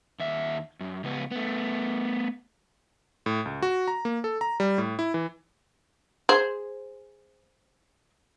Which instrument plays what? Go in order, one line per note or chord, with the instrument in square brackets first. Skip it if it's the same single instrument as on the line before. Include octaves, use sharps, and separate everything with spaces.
[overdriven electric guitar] D#2 E5
F#2
C#2 B3
A3 B3
[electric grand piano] A2
C#2
F#4
A#5
A#3
A4
A#5
G3
A2
E4
E3
[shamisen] G#4 C5